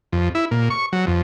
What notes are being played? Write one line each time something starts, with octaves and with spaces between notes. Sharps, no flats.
F2
E4
A#2
C#6
F#3
F2